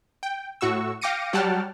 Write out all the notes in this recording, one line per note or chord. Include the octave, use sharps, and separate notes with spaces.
G5
A2 F#4 C#6 E6
F5 G5 D6 A#6 C#7 D#7
F#3 G3 F#5 G5 A5 F6